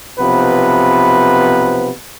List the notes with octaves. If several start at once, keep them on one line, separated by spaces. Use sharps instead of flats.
B1 C3 F3 B3 B4